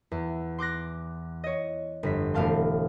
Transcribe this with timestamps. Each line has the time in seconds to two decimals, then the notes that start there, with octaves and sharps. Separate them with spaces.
0.12 E2
0.59 C6 D6 F#6 A#6
1.44 C#5 D#5
2.03 G1 F2 B6
2.34 E1 A3 C4 F5 A5 C6